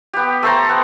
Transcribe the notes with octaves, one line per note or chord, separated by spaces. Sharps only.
B3 G4
A3 A4 C5 A#5
B3